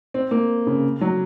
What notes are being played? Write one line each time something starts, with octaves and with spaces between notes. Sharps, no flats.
C4
A#3
C#3
F#3